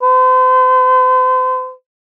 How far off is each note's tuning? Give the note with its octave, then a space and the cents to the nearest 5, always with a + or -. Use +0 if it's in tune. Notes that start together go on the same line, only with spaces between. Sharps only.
C5 -40